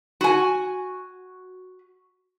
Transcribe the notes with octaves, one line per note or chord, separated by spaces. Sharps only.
F#4 G#5